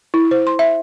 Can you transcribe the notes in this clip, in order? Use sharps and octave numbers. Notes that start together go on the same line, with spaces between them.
E4
C5
C6
E5